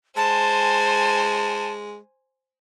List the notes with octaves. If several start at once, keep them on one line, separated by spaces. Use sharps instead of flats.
G#3 C5 G#5 A5